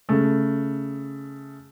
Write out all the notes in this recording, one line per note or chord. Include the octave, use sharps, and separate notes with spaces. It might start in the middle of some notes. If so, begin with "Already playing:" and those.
C#3 A3